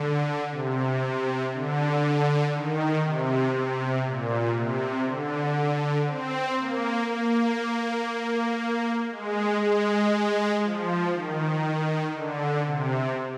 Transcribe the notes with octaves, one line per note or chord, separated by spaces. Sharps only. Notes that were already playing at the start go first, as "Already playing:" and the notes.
Already playing: D3
C3
D3
D#3
C3
C3
A#2
C3
D3
C4
A#3
A#3
G#3
G#3
F3
D#3
D3
C3